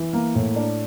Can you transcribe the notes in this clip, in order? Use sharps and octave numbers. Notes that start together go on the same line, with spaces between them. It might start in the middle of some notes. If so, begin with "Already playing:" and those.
Already playing: E3
A#3
A2
D4